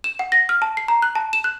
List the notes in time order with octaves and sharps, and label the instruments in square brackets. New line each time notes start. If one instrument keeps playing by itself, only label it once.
[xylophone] E7
F#5
A#6
F6
A5
C7
A#5
F#6
A5
E7
F#6